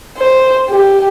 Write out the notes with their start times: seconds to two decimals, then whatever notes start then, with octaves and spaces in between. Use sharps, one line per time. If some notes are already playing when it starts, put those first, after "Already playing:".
0.18 C5
0.70 G4